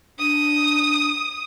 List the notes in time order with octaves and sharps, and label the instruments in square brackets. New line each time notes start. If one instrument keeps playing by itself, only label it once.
[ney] D4 [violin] D#6